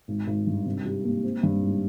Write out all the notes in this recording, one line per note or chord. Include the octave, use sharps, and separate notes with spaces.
G#1
G#1
G2
C3
G3
A#3
C4
G2
G#1